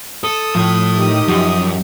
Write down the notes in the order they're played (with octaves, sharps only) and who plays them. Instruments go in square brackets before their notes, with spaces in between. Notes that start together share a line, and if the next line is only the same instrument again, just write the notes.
[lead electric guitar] A4 [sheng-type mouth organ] D#6
[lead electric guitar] A2 A4 [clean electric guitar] F3
[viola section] D#3 G4 D#5
[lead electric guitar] F#2 [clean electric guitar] F3